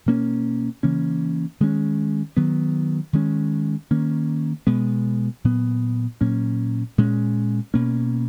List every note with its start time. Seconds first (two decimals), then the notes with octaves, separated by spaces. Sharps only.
0.06 B2 A#3 C#4
0.83 C#3 E3 A#3 C#4
1.60 D#3 G#3 C#4
2.37 D#3 F#3 B3
3.13 D#3 G#3 C#4
3.91 D#3 A#3 C#4
4.67 B2 G#3 B3
5.44 A#2 F#3 B3
6.21 A#2 F#3 A#3 C#4
6.98 A#2 G#3 C#4
7.74 B2 A#3 C#4